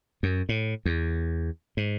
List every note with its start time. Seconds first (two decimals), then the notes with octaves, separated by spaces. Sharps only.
0.23 F#2
0.49 A2
0.85 E2
1.77 G#2